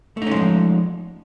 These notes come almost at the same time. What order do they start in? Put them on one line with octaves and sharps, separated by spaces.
A3 D#4 C#4 G#3 F3